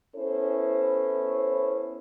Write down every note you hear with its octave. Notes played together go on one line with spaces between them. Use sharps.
B3 C#4 E4 A4 C5